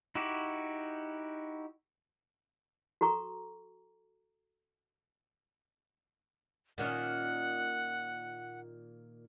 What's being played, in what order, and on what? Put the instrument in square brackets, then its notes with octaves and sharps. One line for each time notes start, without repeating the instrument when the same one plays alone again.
[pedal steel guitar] D#4 E4 F#4 G4
[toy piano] F#4 A4 A#5 C#6
[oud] A#2 D#3 C#4 [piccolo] F#5